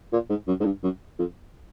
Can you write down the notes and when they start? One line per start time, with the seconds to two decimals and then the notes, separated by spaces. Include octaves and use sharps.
0.13 A#2
0.30 G#2
0.48 F#2
0.60 G#2
0.65 G2
0.83 F#2
1.19 F2